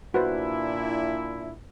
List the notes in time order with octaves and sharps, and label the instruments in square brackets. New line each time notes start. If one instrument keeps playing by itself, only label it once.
[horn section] A#2 D4 E4 [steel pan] F#4 B4 C5